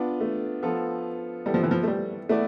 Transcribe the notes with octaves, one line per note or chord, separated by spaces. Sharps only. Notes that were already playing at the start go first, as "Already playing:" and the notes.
Already playing: B3 D4 F4
A3
F3 B3 F4 A4
G3 B3 E4 A4
F3
E3
F3
A3
G3
A3 B3 E4 B4 D5